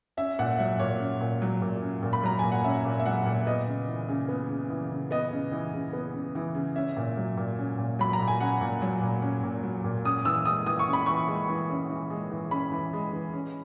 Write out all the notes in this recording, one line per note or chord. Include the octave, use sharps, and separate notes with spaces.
C#4 E5
A#2 F#5
F#3 E5
A#2 C#5
C#4
A#2
F#3
A#2
C#4
A#2
B5
F#3 A#5
A#2 G#5
F#5
C#4 E5
A#2
E5
F#3 F#5
A#2
B3 D#5
C#3
E3
C#3
B3
C#3
E3
C#3
B3 D#5
C#3
E3
C#3
B3
C#3
E3
C#3
C#4 E5
A#2
F#3
A#2
C#4
A#2
F#3 B5
A#5
A#2
G#5
C#4 F#5
A#2
F#3
A#2
C#4
A#2
F#3
A#2
C#4 D#6
E3 E6
G#3 D#6
E3 D#6
C#6
C#4
B5
E3 C#6
G#3
E3
C#4
E3
G#3
E3
C#4 B5
E3
G#3
E3
C#4